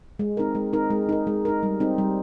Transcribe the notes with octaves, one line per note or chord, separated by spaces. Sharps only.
G#3
C4 D#4 A#4
G#3
C4 D#4 A#4
G#3
D#4 A#4
G#3
D#4 A#4
G3
C4 D#4
G3